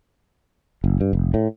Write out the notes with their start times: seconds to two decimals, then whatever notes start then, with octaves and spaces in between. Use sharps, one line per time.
0.84 F#1
1.01 G2
1.13 F1
1.34 A2